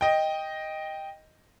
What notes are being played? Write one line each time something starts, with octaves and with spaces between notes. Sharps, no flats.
D#5 G5